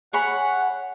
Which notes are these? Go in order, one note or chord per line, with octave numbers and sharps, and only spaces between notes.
G#4 C#5 F#5 B5